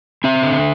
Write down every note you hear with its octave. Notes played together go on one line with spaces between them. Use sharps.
C4 E5
D3